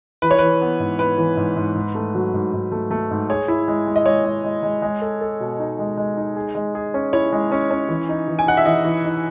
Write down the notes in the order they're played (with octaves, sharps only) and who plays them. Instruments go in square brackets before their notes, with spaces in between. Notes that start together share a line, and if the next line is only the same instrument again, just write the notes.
[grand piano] E3 [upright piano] B4
[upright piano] C#5
[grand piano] E3 [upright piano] B4
[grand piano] B3
G#2
[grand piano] B3 [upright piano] B4
[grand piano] E3
G#2
G#2
G#2
A3
F#3
G#2
G#2
A3
A3
G#2
[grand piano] G#4 [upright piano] C#5
[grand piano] E4
G#3
G#3
[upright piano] D#5
[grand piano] G#3 [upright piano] C#5
[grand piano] G#3
G#3
G#3
G#3
A4
A4
B2
D#4
G#3
G#3
D#4
G#4
G#3
G#4
C#4
[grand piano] E4 [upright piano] C#5
[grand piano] G#3
C#4
C#4
E3
D#4
E3
[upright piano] G#5
[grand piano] D#4 [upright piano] F#5
[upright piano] E5
[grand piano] E3 [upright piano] D#5
[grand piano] E3
D#4